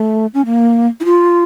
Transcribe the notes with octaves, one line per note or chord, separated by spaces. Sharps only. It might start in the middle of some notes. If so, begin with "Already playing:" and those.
Already playing: A3
C#4
A#3
E4
F4